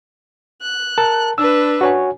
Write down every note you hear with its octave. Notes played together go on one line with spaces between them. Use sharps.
F#6
A#4 A5
D4 B4 E6
F#4 C#5 G#5